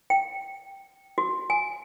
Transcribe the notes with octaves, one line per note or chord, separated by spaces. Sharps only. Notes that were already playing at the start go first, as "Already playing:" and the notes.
G5
F#4
G#5